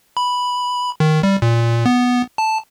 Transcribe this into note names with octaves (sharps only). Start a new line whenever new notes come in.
B5
D#3
G3
A#2
B3
A5